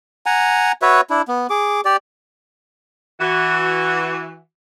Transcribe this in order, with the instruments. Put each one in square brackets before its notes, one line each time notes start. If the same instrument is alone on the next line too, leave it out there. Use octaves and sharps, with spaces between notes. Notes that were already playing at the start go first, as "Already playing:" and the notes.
[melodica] F#5 G#5 A#5
F#4 B4 C#5 E5
D4 E4
B3
G#4 D6
G4 D5
[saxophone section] E3 F#4